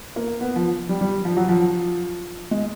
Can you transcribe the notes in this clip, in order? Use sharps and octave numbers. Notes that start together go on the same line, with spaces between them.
A#3
B3
F3
G3
G3
F3
F#3
F3
G#3